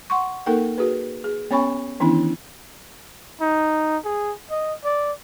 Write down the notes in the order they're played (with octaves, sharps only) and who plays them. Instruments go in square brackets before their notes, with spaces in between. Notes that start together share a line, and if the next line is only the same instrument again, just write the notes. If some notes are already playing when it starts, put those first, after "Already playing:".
[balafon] F#5 C6 C#6
A#3 D#4 A4 A#4 G5
F#4 G#4 B4
G#4
B3 C#4 C#5 G#5 B5 C#6
D#3 E3 B3 C#4 D4 E4
[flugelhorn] D#4
G#4
D#5
D5